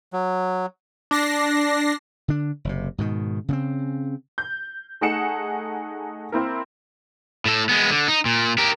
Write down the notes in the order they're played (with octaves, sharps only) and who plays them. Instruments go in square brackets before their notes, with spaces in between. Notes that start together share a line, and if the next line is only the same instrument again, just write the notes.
[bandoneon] F#3
[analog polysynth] D4 A#6 C7
[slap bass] D3 D4
F#1 C3
G#2 B2 D#3
C#3 B3 C4
[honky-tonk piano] G6
A3 D#4 G#4 F#5 C#7 E7
A#3 C4 E4 A#4
[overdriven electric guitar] A2 A4
G#3 B3
D3
D#4
A#2
G4 A#4